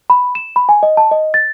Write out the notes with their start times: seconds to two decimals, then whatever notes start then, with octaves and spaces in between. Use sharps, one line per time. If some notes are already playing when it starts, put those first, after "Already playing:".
0.10 B5
0.35 E7
0.56 B5
0.69 G#5
0.83 D#5
0.97 A5
1.11 D#5
1.34 A6